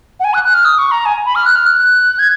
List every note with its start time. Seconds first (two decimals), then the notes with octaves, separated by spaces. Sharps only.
0.20 F#5
0.24 G#5
0.34 F#6
0.44 F#6
0.54 F6
0.65 D#6
0.78 C#6
0.91 A#5
1.06 G#5
1.26 B5
1.35 F6
1.46 F#6
1.56 F6
1.66 F#6
2.19 G#6